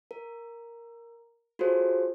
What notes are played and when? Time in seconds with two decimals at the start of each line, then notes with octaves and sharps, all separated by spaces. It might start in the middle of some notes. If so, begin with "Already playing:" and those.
0.11 A#4
1.59 F4 F#4 G#4 A4 C5 C#5